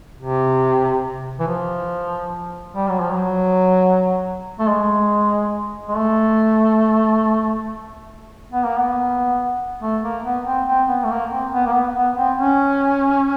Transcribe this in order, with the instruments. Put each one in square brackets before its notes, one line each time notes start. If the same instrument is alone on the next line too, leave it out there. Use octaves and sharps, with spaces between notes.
[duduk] C3
E3
F3
G3
F#3
F3
F#3
A3
G#3
G#3
A3
B3
A#3
B3
A3
A#3
B3
C4
C4
B3
A3
A#3
C4
B3
A#3
B3
B3
C4
C#4